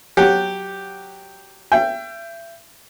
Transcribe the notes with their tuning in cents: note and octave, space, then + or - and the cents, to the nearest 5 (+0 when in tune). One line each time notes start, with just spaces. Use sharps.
F#3 +0 G4 +0 F#5 +0
E5 +35 G5 +0